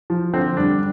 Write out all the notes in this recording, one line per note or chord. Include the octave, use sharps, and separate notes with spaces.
F3
D3 C4
G3 D4